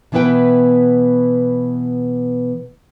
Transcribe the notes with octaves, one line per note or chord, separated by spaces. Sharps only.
B2 E3 B3 E4 B4 G5